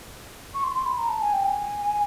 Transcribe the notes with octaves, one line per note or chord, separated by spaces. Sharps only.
C#6
C6
C6
B5
A#5
A5
G#5
G5
G#5